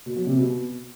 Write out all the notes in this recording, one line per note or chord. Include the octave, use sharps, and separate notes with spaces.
B2
F#3
C3
B2